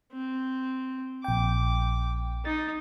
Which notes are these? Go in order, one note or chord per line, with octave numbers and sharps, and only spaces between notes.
C4
A#1 G5 D6
D#4 A6